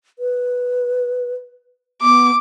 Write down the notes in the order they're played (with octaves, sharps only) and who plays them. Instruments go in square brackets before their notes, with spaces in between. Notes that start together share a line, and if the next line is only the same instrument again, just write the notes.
[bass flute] B4
[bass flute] B3 [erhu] D6